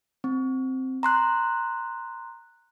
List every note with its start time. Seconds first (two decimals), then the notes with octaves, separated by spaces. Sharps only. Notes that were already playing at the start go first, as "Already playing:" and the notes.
0.24 C4
1.03 A#5 C6 F#6